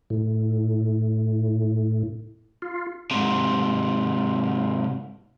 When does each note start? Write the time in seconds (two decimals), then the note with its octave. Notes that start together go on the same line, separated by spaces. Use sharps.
0.10 A2
2.62 F4
3.11 G#2 C3